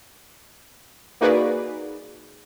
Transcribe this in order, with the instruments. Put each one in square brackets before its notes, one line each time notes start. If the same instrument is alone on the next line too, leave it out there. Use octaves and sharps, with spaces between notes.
[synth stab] A#3 D#4 F#4 G#4 B4 D5